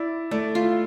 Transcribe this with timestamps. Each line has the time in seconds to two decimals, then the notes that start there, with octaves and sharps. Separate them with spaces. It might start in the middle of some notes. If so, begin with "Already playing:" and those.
Already playing: E4 D5
0.31 A3 D5
0.55 F4